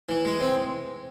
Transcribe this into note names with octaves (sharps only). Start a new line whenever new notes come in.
E3
G#3
C4